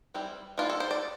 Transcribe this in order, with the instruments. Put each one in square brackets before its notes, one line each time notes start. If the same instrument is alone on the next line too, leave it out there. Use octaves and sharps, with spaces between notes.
[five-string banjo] E3 G3 C4
E3 A#3 D4 F4
A4
C5
D5